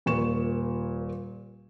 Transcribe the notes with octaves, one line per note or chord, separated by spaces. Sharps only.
D#1 A#2 B4 C#6 E7